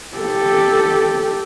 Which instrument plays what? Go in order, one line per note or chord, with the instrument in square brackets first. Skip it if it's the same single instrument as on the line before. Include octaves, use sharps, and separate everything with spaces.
[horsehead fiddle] G4 A4